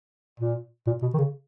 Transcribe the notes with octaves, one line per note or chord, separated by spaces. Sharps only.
A#2
A#2
B2
D#3
C#3